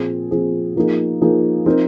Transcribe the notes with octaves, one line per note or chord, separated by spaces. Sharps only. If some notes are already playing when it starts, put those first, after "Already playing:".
Already playing: A#2 F3 C4 G#4
A#2 F3 C4 G#4
F3 A#3 D#4 G#4
F3 A#3 D#4 G#4
F3 C4 D#4 A#4